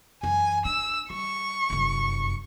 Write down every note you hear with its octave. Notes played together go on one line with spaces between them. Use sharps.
F#2 E3 G#5
D4 E6
G3 C#6
F1 F#2